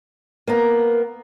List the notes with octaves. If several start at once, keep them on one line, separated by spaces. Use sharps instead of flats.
A#3 B3 A#4